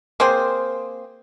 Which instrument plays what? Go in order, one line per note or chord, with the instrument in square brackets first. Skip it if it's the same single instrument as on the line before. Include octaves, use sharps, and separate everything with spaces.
[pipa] A#3 C4 G#4 C5